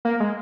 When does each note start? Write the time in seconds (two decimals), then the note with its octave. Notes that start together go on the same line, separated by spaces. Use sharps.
0.05 A#3
0.20 G#3